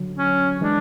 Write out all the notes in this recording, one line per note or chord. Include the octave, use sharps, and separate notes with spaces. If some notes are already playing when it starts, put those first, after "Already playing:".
Already playing: D3 F#3
C#4
E3 G#3 D4